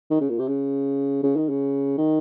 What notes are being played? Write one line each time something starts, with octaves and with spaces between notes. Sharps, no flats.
D#3
C#3
A#2
C3
C#3
C#3
D#3
C#3
D#3